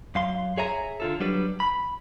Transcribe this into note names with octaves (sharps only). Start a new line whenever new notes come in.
F#2 F5 C6
G#4 C#5 E5 G#5 A#5
D3 F4 A4
F#3 G3 D4 B4
B5